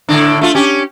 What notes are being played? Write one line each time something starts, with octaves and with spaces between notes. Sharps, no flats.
A2 D3 D4
A3 F4
C#4 G4